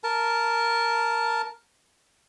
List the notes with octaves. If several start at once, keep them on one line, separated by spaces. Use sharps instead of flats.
A#4 A5